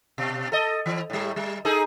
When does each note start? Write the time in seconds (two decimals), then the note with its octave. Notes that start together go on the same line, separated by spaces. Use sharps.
0.18 B2
0.52 A4 D#5
0.86 E3
1.10 A2 G3
1.36 G3
1.65 D#4 G#4 A4